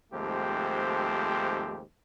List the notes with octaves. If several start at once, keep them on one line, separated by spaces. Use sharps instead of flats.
D#2 G#2 F3 A3 C4 G4